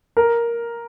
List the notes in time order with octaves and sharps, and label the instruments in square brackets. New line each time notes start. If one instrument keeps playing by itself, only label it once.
[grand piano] A#4